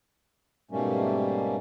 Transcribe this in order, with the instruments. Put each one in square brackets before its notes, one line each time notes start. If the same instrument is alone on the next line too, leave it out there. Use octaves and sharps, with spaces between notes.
[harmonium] G#2 B2 G3 A3 A#3 C#4